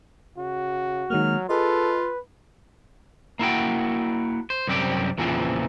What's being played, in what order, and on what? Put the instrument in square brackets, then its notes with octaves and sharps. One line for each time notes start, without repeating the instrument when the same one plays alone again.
[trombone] C#3 [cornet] F#4
[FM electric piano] D#3 G#3 A#3 [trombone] F#3 [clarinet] F6
[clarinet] F4 [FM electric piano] G#4 D#5 [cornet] A4 [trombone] B4
[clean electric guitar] A#3 E4 F#4 G5
C5
C2 F#2 C4 G4 D5
E2 A#2 C#3 E3 F3 C4